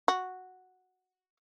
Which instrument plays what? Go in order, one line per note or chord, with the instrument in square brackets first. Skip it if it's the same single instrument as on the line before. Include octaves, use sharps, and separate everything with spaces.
[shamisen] F#4